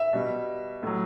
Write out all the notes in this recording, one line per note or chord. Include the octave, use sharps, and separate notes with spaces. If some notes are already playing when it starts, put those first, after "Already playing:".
Already playing: E5
B2 G3
A2 F#3